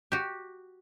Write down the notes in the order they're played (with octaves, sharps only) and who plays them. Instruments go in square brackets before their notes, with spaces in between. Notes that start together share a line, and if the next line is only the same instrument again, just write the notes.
[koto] F#4 G4